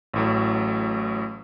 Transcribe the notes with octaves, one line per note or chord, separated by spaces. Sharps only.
A1 A2 F#3